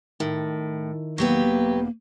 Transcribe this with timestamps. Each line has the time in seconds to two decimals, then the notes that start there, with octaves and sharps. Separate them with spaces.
0.20 A2 D#3
1.18 E1 F#3 A#3 B3 G4 B4